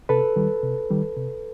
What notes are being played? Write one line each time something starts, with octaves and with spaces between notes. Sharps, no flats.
C3 A4 B4
D#3 G3
C3
D#3 G3
C3